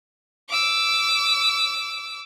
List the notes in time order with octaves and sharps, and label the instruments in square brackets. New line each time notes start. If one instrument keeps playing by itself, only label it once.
[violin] D6 E6